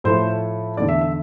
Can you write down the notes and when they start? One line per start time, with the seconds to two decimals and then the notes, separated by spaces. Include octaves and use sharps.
0.04 A2 F3 A3 C5
0.77 E2 D3 A3 D5
0.89 E5
1.01 E5